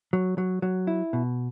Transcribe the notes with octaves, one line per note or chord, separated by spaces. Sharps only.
F#3
F#3
F#3
E4
B2